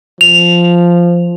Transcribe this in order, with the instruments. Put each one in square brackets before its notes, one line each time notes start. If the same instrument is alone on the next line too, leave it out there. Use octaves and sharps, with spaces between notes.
[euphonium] F3 [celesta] F7